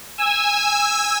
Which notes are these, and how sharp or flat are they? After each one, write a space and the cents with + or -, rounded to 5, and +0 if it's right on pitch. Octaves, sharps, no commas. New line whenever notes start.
G#5 -10 E6 -5